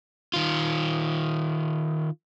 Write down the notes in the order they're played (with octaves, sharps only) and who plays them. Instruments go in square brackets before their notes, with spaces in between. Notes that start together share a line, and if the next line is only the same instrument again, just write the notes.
[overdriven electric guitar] D#3 F4